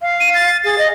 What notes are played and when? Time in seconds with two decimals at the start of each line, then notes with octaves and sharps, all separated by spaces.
0.01 F5
0.20 D#7
0.34 A6
0.64 G#4 A6
0.78 D#5